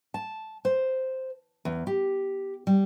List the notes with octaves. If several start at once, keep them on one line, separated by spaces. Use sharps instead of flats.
A5
C5
E2
G4
G3